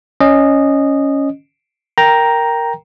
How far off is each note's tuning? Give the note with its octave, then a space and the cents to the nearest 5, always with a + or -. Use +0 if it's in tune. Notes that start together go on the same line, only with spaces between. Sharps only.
C#4 +0 D#5 -15
A#4 -5 G5 +0 A#5 +5